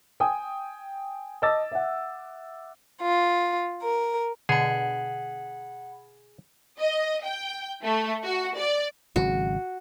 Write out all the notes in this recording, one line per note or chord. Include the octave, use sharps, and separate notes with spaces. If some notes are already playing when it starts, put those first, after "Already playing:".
G5 G#5 D#6
D#5 A5 D6 E6 A6
E5 F#5
F4
A#4
B2 D3 G#4 F#5 B5
D#5
G5
A3
F#4
D5
G#1 C#3 F#3 F#4